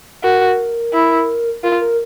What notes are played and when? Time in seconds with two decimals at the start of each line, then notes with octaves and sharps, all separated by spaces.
0.23 F#4 A#4
0.93 E4
1.63 F4 A#4
1.81 A#4